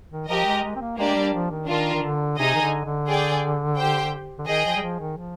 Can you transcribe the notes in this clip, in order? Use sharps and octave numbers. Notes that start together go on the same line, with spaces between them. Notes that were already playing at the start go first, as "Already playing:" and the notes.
D#3
F3 G4 A#4 D#5
G#3
G#3
C4
A#3
G#3 A#3 D4 G4 D5
G#3
G3
F3
D#3
D#3 D4 F4 A#4
D#3
D3
C3 D#4 G#4 D#5 G#5
D#3
D3
D3
G#4 D5 G5
G4 C5 G5
D3
D#3 G#4 D#5 G5
F3
G3
F3
D#3
F3